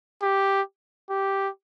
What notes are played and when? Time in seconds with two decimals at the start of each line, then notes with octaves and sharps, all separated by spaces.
0.23 G4
1.10 G4